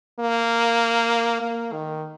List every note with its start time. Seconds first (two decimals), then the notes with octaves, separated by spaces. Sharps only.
0.20 A#3
1.41 A#3
1.72 D#3